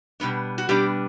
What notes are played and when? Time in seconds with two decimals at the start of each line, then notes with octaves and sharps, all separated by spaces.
0.20 B2 G3 B3 D4
0.58 F#4
0.69 B2 G3 B3 D4 G4